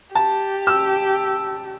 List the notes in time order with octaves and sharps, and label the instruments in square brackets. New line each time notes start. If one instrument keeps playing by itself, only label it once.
[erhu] G4 [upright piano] A5
[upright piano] E6